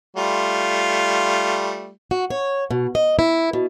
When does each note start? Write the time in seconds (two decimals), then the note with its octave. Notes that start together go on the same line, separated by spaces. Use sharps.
0.17 G3 A3 F4
2.11 F#4
2.30 C#5
2.71 B2
2.95 D#5
3.19 E4
3.53 B2